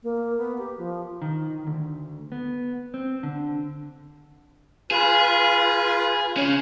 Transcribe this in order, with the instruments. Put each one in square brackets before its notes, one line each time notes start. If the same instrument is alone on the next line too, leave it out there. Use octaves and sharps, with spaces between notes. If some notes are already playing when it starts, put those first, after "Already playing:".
[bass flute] A#3
B3
G4
F3
[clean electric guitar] D#3
D2
B3
C4
D3
[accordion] F4 B4 [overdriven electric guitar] G#4
[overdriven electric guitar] C#3 C#4